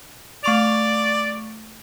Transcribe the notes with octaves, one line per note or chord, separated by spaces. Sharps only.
A3 D5 C#6 F7